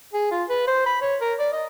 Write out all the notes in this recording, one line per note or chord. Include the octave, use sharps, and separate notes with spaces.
G#4
F4
B4
C5
B5
C#5
A#4
D5
D#5